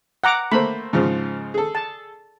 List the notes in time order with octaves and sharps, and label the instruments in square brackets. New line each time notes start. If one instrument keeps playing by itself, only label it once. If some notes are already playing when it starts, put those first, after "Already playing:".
[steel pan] F#5 A#5 D6
[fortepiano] A3 A#3 C5 [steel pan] B5
[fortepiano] G#2 C#3 F3
G#4 A4
[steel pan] A5